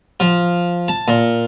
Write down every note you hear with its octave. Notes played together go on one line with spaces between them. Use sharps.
F3
A5
A#2